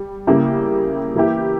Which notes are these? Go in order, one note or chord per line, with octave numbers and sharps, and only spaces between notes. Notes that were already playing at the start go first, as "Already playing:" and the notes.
Already playing: G3
C#3 G3 A#3 E4 G4
E3 A#3 E4 G4